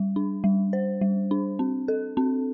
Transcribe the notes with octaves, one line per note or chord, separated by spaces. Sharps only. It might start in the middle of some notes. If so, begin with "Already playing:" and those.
Already playing: G3
D4
G3
C5
G3
D4
C4
A4
C4